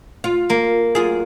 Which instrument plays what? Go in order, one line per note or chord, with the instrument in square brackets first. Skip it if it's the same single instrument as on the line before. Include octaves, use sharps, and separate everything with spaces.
[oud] F4
[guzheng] A#3
[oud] F#2 F4 G#4